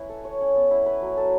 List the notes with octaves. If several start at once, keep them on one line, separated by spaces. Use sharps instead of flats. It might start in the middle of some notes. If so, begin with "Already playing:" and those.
Already playing: C#4 E4 B4
A4
C#5
C#4
B3
E4
B4
F#3
A4